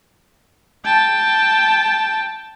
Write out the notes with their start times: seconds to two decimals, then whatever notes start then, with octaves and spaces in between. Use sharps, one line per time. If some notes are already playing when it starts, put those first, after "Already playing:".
0.85 G5 A5